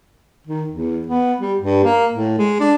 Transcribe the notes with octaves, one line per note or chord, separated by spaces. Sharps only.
D#3
E2
B3
G3
G2
A#3
A2
G#3
D4